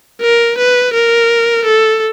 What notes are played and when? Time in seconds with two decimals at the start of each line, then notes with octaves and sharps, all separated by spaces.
0.22 A#4
0.58 B4
0.94 A#4
1.65 A4